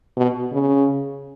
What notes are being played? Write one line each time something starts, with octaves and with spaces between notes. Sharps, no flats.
B2
C#3